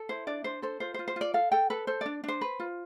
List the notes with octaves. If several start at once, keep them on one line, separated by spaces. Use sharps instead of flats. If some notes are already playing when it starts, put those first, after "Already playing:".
Already playing: A4
E4 C5
D4 D5
D4 C5
A4 C5
F4 C5
C5
F4
C5
F4 D5
A4 F5
A4 G5
A4 B4
A4 C5
D4 D5
D4 C5
B4
F4